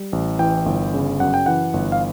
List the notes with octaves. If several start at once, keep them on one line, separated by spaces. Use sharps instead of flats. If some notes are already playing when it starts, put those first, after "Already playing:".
Already playing: G3
A1
E3 G5
G1
C#3
F#2 F#5
G5
E3 F#5
G1
F5